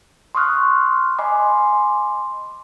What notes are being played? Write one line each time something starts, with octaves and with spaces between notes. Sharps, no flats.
C6 C#6 D#6 F6 F#6
D#5 G#5 B5 C6 D6